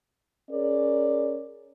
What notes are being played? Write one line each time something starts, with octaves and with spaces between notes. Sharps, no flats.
C#4 G#4 A#4 C#5 D5